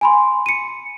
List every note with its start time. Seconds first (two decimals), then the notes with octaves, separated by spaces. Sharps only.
0.01 G#5 B5 C6
0.46 C#7 D#7